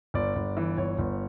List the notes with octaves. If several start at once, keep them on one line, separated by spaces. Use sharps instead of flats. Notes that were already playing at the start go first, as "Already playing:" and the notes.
G1 D5
G1
E3
G1 C#5
G1